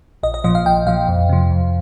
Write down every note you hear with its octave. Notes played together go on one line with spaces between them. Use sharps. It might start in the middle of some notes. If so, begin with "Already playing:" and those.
A#1 D#5
D#5
A#2 F3 D#5
F5
A#1 G5
A#2 F3 F5
F2
C3 F3
F2